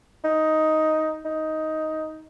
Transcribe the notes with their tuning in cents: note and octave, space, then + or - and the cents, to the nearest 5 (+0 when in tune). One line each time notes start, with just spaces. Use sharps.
D#4 +10
D#4 +10